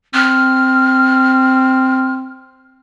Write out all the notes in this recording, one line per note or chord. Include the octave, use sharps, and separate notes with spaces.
C4 F6